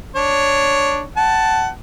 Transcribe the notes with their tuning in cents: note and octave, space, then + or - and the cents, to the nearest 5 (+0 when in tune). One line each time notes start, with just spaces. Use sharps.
D4 +0 C#5 +0
F#5 +20 A5 +0